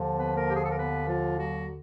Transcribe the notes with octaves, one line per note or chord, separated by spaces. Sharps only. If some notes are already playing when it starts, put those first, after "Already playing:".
Already playing: D#2 D3 F3
B3 B4
A#3 A#4
G4
G#4
A4
A#4
B3 B4
F3 F4
F#3 F#4